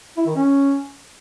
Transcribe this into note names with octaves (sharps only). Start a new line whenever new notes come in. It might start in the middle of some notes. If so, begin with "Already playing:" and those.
E4
D#3
C#4